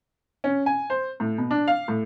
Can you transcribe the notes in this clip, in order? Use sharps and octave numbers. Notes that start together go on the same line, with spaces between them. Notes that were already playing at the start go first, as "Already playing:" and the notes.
C#4
G#5
C5
A2
B2
D4
F5
A2